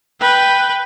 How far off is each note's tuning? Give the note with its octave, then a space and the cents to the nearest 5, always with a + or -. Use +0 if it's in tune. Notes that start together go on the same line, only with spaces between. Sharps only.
B4 +0 G5 +0